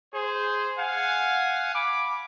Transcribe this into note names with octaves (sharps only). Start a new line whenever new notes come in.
G#4 C5
F5 F#5 G#5
B5 D6